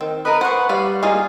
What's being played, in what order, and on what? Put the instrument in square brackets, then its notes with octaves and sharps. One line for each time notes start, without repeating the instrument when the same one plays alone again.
[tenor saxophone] D#3 [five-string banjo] C4
[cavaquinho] A#4 D#5 [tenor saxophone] B4
[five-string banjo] C5 [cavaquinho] F#5 C#6
[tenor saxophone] G3 [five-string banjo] B4 F5
[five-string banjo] A#3 D#4 F4 [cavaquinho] G#4